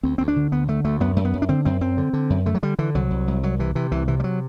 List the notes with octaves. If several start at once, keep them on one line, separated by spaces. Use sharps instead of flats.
D2 C4
D2 C4
D4
D3
D2 B3
D3 A3
D2 A3
F#2 B3
F#2 A3
B3
F#2
D4
D3 C4
F#2 C4
F#2 C4
D3
D3
F#2
D3 A3
F#3
D3 G3
D3 E3
C2 F#3
C2
C2
C2 F#3
C3 E3
C3 E3
C2 E3
C3 E3
G3
F#3